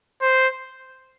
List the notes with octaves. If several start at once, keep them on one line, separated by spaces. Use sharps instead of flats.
C5